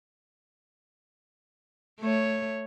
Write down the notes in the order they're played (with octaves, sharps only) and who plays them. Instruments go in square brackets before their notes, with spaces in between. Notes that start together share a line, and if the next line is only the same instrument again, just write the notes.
[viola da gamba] A3 C#5